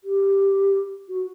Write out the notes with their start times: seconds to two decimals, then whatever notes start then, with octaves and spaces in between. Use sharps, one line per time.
0.04 G4
1.09 F#4